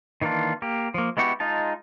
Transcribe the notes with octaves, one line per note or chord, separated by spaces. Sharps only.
D#3 E3 A#3 D4 F4
A#3 G4
F3 A#3
G#3 B3 E4 F#4 G4
G#3 D#4 F4 A5